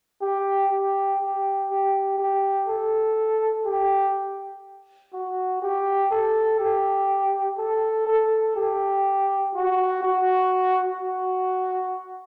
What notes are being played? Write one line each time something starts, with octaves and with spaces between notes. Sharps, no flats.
G4
G4
G4
G4
G4
A4
G4
F#4
G4
A4
G4
A4
A4
G4
F#4
F#4
F#4